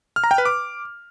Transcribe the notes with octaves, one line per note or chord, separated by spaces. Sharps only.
F6
A#5
G5
B4
D6